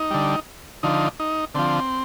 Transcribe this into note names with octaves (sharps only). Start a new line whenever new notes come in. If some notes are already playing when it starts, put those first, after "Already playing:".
Already playing: D#4
D3 G3
D3 F3 D#4
D#4
D3 F3 C4